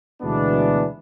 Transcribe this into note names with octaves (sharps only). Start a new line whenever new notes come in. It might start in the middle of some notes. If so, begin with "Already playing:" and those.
D2 B2 E3 G#3 B3 D4